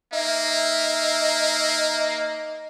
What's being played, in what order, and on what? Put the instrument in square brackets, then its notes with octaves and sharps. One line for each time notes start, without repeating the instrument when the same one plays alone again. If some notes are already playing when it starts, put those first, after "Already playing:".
[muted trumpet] A#3 [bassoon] D#4 [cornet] E5